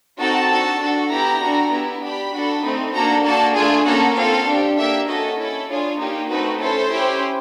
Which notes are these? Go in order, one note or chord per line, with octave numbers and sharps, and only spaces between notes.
C4 D#4 F#4 A4 A5
D4 F#4 A4
D4 F#4 A4
B3 E4 G4 A#5
D4 F#4 A4
B3 E4 G4
D4 G4 B5
D4 F#4 A4
A3 C4 D#4
A#3 D4 F#4 A4 A#5
A#3 D4 F#4 A4 A5
A3 D4 F4 G#4 G#5
A#3 C#4 F#4 A4 F#5
C4 F4 A4 F5
D4 G4
A#3 D4 G4 E5
C#4 F#4 A4 D#5
C#4 E4 A4
D4 F4 G#4 C#5
A#3 D#4 G4
A3 C4 D#4 F#4 B4
C#4 E4 A4 C5
C#4 E4 G4